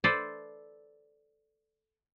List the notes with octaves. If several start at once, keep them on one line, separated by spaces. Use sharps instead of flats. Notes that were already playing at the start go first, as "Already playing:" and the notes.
A4 B4 C5 D5 E5